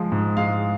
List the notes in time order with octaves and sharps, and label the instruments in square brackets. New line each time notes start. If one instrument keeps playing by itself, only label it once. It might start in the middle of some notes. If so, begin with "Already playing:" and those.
Already playing: [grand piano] F3 G#3
G#2
G#3 F5